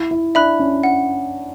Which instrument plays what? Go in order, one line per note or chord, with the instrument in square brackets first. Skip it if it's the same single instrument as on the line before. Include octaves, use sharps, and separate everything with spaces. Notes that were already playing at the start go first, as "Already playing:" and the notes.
Already playing: [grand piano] E4
E4
[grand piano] D4 [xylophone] E5 B5 F#6
[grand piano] C#4
[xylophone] F#5